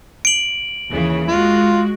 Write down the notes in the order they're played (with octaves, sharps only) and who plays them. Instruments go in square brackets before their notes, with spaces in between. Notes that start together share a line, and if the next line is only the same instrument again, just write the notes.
[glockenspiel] D7 F#7
[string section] D#2 C#3 E3
[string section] G#3 F#4 [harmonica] F4